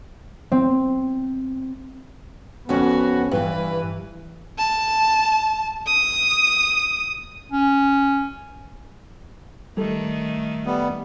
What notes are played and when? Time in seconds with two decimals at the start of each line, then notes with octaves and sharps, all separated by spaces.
0.52 C4
2.69 F2 B3 C#4 F#4
3.32 G2 E3 B4
4.58 A5
5.87 D#6
7.51 C#4
9.77 D#3 G3 A3 A4
10.66 G3 B3